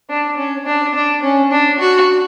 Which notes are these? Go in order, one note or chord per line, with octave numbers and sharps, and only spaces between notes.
D4
C#4
D4
D4
C#4
D4
F#4